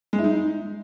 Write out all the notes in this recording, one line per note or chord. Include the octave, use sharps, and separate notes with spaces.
G#3
E4
D#4